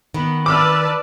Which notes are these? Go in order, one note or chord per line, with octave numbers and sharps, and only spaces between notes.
D#3 B3 B5
B4 D5 A5 D6 E6 F6